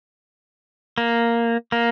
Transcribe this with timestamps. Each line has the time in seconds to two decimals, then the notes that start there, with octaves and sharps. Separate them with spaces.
0.98 A#3
1.72 A#3